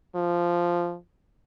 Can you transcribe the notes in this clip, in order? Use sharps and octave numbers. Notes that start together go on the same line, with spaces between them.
F3